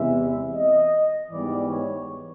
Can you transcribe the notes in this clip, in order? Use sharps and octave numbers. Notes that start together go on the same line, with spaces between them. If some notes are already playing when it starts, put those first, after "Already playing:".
Already playing: E2 C3 E3 G#3 B3 E5
D#5
G#2 E3 G3 B3 D5
C#5